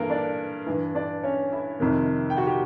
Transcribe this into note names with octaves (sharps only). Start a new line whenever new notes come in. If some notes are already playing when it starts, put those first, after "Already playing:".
Already playing: G2 E3 A#3 A4 A#4
D4 D5
G2 E3
D4 D5
C#4 C#5
E4 E5
F2 C3 D#3
G5
F#4 F#5
G4 G5